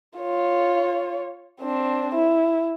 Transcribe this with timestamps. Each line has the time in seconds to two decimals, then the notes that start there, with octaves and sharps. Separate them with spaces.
0.18 F4 C#5
1.62 C4 D4
2.15 E4